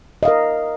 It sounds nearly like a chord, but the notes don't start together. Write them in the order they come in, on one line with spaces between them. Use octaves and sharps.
D#5 F5 A#4